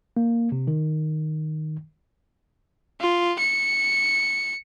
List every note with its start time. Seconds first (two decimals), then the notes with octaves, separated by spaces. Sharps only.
0.17 A#3
0.52 C3
0.67 D#3
3.01 F4
3.39 C#7